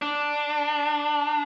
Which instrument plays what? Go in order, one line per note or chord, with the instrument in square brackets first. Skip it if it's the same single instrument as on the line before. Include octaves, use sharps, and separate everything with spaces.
[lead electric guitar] D4